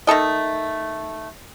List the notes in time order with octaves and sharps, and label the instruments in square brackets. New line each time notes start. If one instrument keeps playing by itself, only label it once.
[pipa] D#3 A3 A4 D#5